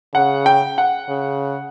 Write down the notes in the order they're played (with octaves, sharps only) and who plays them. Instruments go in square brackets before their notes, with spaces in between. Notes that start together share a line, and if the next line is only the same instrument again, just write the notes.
[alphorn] C#3 [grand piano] F#5
[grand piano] G5
F#5
[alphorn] C#3